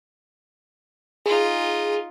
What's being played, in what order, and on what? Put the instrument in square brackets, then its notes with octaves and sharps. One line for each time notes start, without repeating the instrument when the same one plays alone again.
[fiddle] D#4 F4 [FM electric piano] G#4